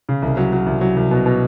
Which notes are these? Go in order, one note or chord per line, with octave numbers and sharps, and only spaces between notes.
C#3
C2
F#3
F#3
C2
F#3
C2
B2
B2